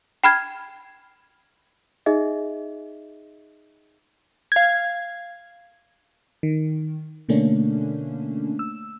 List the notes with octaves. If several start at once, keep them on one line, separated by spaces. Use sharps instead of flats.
G5 B5 F6 G#6
D#4 G#4 D#5 E5
F5 G#6
D#3
B2 D3 A3 A#3 C#4 D4
E6